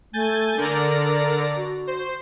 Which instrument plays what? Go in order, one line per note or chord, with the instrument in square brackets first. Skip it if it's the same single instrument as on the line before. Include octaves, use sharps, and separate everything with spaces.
[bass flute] A3 [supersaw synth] G#5 G6 A6
[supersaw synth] D3 D5 A#5 [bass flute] A#4
[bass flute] F#4
[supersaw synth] C5